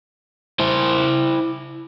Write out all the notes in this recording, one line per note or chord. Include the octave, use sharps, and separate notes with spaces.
E4 C5